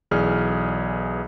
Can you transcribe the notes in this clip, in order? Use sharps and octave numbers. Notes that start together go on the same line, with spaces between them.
B1 E3 G#4 D5 F6